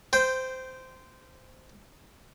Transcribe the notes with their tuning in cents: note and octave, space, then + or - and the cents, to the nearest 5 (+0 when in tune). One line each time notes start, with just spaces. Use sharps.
C5 -15 G5 +0